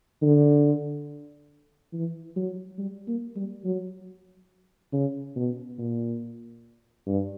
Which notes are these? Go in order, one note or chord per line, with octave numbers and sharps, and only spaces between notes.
D3
E3
F#3
G3
A#3
G3
F#3
C#3
B2
A#2
G2